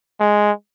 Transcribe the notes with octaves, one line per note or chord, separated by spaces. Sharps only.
G#3